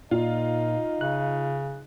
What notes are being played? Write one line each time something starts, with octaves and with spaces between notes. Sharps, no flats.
A#2 D#4 F4
C#3 F#6